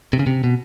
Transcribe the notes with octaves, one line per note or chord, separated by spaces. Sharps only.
C3
C#3
C3
B2